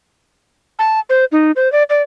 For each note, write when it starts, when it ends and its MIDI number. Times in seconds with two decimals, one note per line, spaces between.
0.79 1.00 81
1.09 1.25 72
1.32 1.51 63
1.56 1.71 72
1.72 1.83 74
1.90 2.02 74